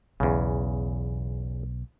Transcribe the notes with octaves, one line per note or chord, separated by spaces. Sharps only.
B1 E2 C#3